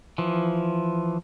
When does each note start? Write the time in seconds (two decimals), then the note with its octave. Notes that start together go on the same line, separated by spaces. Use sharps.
0.18 E3 F3